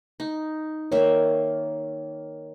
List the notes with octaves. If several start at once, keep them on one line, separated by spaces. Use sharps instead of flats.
D#4
D#3 A#3 C#5 E5